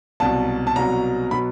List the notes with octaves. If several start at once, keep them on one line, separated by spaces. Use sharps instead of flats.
C2 B2 F#3 A5
A5
C2 B2 F#3 A#5
B2 F#3 B5